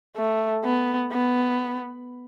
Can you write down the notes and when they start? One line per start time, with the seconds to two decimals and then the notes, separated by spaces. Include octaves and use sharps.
0.17 A3
0.64 B3
1.12 B3